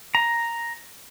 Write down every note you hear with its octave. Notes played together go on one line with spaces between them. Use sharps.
A#5